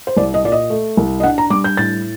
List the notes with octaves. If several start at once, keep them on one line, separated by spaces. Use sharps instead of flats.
C5
C2 D5
D#5
A#2 D5
D#5
A3
C2
D#5
D4 F#5
A#5
G3 D6
G6
A2 A6